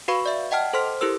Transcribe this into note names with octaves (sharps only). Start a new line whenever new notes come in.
F#4 B4 F5 B5 C#6
D5 E5
D#5 F#5 G5 A5 F6
A4 C5 C6 F6 B6
E4 G4 A4 A#4 E6